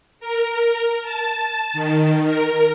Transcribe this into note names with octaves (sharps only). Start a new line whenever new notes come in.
A#4
A5
D#3
A#4